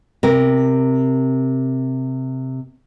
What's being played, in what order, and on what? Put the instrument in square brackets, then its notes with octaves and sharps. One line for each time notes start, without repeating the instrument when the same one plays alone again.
[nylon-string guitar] C3 A#4